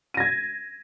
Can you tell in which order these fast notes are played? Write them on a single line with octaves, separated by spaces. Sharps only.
D#7 A#6 G#6